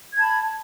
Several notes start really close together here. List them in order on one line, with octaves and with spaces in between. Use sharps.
G#6 A5 B5